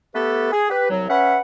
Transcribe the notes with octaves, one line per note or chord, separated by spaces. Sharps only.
A3 B3 G4 A4 B4
G#4
G4 B4
C2 F#3
C#4 B4 E5 F#5